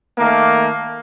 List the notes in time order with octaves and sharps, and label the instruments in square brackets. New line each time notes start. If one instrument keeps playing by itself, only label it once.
[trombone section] D#3 A3 A#3